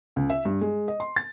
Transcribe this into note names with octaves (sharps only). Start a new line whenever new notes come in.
C#2
E5
G2
G#3
D#5
C6
A6